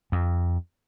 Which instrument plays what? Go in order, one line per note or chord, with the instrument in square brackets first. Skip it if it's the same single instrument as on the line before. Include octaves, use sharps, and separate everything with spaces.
[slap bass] F2